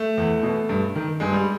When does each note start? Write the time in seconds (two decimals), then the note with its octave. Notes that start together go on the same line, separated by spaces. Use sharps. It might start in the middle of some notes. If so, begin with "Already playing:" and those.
Already playing: A3
0.17 E2
0.43 B2
0.69 G2
0.95 D#3
1.20 G2 G#3
1.33 G3